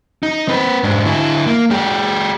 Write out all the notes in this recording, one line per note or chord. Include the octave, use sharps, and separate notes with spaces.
D#4
C4 B4
G#2 D4
D3 E4
A#3
G#3 G4